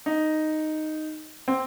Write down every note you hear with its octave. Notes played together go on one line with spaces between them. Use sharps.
D#4
C4